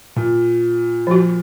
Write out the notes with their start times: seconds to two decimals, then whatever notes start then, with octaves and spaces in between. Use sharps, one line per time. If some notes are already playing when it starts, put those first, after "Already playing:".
0.16 A#2
1.07 F3 F#4